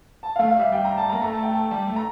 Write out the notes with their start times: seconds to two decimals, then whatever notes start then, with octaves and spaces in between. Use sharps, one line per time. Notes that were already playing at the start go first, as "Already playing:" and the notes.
0.23 A5
0.36 F5
0.39 A3
0.48 F5
0.57 G3 E5
0.72 G3 G5
0.85 A#5
0.97 A5
1.09 A#5
1.13 A#3
1.21 A3 A#5
1.32 A5
1.43 G5
1.52 A5
1.71 G3 A5
1.87 A3
1.96 A#5